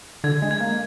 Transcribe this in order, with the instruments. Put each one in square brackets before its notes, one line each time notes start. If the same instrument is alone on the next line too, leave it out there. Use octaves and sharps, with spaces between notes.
[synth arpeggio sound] D3 [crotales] G#6
[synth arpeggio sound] G#3
[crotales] G#6
[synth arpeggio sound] A#3